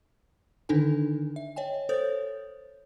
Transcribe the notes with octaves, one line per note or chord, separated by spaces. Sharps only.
D3 D#3 D4 D#4 A4 G#5
E5
C#5 D#5 G5 G#5
A4 C5 C#5 D#6 G6 A6